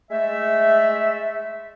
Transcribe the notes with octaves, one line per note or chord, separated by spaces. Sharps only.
G#3 A3 E5